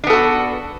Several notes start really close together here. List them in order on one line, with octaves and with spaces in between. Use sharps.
D4 B3 A4 F#4